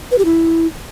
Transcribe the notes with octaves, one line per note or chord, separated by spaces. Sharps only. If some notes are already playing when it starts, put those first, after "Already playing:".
B4
G4
E4